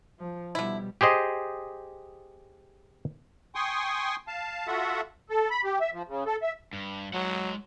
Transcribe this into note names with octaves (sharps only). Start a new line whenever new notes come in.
F3
B2 D3 G3 E4
G4 G#4 C5 D#5
G5 G#5 C6 C#6 D#6
F5 A5
F4 F#4 A4 E5 F#5
A4
B5
G4
E5
F3
C#3
A4
E5
G2
F#3 G#3 F#5